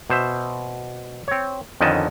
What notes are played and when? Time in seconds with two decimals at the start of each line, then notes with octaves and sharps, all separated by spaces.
0.10 B2 C5 E5
1.28 C4 C#5
1.81 F2 D3 D#3 C#4 D#5 A5